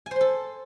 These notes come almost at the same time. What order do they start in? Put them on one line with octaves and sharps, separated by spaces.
G#5 C5 C6 A4